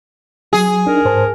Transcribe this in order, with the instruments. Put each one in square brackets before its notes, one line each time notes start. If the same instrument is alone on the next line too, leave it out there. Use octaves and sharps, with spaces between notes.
[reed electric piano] F#3 [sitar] G#4
[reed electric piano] D4 D#4 [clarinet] A#4
[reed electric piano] G#2 C5 A5